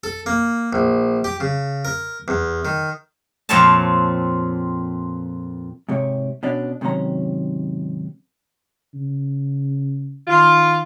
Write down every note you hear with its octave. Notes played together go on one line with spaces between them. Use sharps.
A4
A#3
A#1
G4
C#3
A#4
E2
D#3
F2 A#2 C4 C#5 F5 A5
G#2 C3 G4 C#5
B2 C#4 D4
G#2 C3 D#3 F#3 C#4 A#5
C#3
D#3 F4